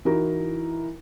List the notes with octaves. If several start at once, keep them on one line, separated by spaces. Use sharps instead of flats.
E3 D#4 E4 F#4 A#4